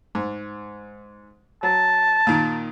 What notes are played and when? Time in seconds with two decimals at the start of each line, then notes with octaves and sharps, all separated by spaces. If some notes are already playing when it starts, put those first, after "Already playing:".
0.15 G#2
1.63 F#3 A5
2.27 A#2 D#3